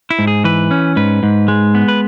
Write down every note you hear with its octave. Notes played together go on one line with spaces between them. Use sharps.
E4
G#2
G#4
E3 B4
C#4
G#2 B4
G#2
G#3
B3
B4